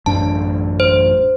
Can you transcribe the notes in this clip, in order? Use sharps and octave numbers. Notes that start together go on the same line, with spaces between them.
A1 F#2 D4 A5
C5